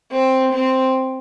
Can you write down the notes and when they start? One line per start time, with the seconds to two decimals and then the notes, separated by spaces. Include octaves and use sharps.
0.12 C4
0.53 C4